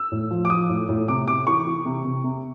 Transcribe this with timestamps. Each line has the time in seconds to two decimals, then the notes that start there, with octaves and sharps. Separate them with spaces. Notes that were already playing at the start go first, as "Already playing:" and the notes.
Already playing: E6
0.12 A2
0.31 F3
0.45 D6
0.50 F3 D#6
0.69 A2
0.89 A2
1.08 C3 D6
1.27 C3 D6
1.47 E3 C#6
1.67 E3
1.85 C3
2.05 C3
2.24 C3